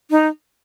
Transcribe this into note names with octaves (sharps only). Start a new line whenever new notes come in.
D#4